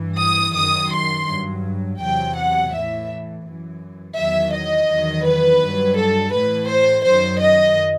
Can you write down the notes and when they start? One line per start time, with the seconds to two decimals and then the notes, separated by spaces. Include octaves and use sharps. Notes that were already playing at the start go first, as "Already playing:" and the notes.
Already playing: G2 E3
0.20 D#6
0.57 F#2 D#3 F#3 D#6
0.93 C6
1.29 G2 F#3
2.01 E2 C3 F#3 G5
2.37 F#5
2.73 A2 E3 E5
3.46 F#2 E3
4.17 E2 D#3 F#3 E5
4.53 D#5
4.90 E2 D#3 F#3
5.25 B4
5.61 G2 F#3
5.98 A4
6.33 A2 E3 B4
6.69 C5
7.06 F#2 D#3 F#3 C5
7.42 D#5